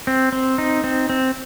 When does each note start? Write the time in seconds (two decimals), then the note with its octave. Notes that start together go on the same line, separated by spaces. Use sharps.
0.07 C4
0.32 C4
0.58 D#4
0.84 C4
1.10 C4